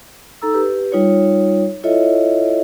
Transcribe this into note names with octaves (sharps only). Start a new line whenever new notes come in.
D#4 A4 A#5 E6
G4 B4
G3 D#4 F4 C#5
E4 F4 A4 C#5 D#5 E5